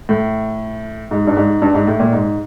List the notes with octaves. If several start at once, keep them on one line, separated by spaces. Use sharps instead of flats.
A2
G#2
G2
G#2
G2
G#2
A2
A#2
G#2